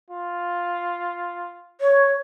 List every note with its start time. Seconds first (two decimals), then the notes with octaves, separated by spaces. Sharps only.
0.10 F4
1.81 C#5